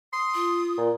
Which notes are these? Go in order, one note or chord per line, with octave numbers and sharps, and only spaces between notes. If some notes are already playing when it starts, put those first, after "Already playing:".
C6 D#6
F4
A#2